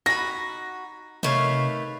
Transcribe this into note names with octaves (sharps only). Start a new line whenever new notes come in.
D#4 F#4 B5 A#6
C3 D#3 A3 B4 C#5 F5